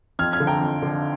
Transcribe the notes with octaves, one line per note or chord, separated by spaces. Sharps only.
F2 F6 G#6
F6 G#6
D3 F3
G5 A#5
F2
D3 F3